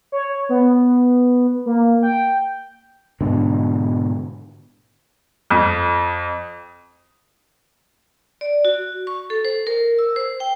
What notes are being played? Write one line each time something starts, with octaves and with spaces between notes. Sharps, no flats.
C#5
B3
A#3
G5
G#2 B2 D3
F2
D5
F#4
C#6
A4
C5
A#4
E6
C5
G5